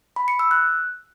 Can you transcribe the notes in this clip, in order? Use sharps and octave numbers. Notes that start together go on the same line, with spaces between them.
B5
C#7
E6
F#6